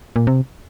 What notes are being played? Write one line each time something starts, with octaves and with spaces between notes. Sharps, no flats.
A#2
C3